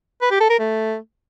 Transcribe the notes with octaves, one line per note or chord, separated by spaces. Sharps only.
B4
G4
A4
A#4
A3